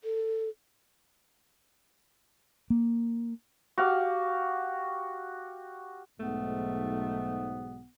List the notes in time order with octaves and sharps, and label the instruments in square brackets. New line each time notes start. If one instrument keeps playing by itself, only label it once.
[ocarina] A4
[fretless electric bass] A#3
[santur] F#4 G4 F5
[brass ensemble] B1 G#2 [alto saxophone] A3 [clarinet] B3